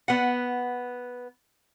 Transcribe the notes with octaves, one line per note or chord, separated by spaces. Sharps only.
B3 F#5